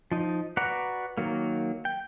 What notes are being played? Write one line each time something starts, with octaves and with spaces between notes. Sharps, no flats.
F3 D#4
F#4 B4 D5 F#5 A#5
D#3 F#3 A#3
G5